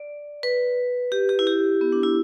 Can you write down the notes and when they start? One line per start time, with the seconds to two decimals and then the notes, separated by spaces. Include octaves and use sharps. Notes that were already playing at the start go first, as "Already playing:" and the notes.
Already playing: D5
0.43 B4
1.12 G4
1.29 G4
1.39 E4
1.47 G4
1.81 B3
1.92 D4
2.03 E4